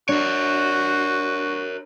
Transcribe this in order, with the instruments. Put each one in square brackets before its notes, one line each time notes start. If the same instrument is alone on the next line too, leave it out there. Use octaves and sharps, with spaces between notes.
[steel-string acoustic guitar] D4 [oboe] F#4 [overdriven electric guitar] A#4 C#5